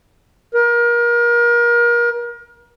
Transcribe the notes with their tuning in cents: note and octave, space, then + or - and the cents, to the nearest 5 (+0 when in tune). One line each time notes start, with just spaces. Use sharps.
A#4 +30